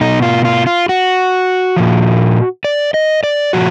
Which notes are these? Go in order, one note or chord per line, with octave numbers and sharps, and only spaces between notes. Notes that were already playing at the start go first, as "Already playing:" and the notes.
B2 D#4
F4
F4
F4
F#4
A#2 F3
D5
D#5
D5
A#2 F3 F#4